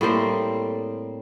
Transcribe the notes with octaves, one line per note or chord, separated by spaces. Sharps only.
A2 G3 A#3 C4